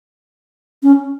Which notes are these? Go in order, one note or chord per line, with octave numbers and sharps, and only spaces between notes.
C#4